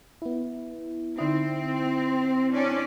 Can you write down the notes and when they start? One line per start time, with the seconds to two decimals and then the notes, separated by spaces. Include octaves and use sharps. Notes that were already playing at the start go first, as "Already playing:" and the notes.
0.22 B3 E4
1.18 D3 C4 D#4 E4
2.53 C#4 D4 D5